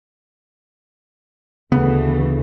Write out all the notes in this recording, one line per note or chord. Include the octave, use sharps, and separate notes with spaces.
D2 C#3 E3 A3 B3